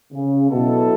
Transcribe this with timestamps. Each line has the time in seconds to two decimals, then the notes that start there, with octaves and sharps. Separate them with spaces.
0.12 C#3
0.50 B2 F#3 B3 E4 A4